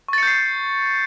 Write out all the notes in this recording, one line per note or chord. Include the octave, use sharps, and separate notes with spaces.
C#6 G6 A6 C7 C#7